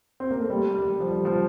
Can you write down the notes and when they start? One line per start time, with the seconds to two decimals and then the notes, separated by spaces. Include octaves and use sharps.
0.20 C4
0.31 A#3
0.40 A3
0.50 G3
0.75 G3
1.00 F3
1.12 G3
1.25 F3